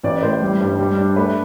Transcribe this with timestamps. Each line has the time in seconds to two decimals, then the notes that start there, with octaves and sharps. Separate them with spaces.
0.03 A1 D5
0.23 A2 C5
0.42 G3
0.61 G2
0.79 G3
0.97 D4
1.16 A3 B4